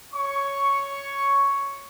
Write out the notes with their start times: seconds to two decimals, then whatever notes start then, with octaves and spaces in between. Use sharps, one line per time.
0.13 C#5 C#6